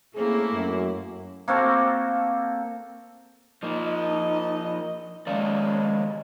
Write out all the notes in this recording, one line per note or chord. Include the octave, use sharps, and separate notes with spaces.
A3 A#3 C4 C#4 E4 G#4
F#2
A#3 C4 F#4 A4
F3 A#3 D#4 D#5
F2 D#3 G#3 A#3 C#4 D5